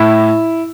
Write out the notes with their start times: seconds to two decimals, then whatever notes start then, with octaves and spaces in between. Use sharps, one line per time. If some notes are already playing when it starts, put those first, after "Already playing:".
Already playing: A2 E4